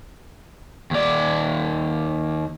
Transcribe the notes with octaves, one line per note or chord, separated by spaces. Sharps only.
D#2 D5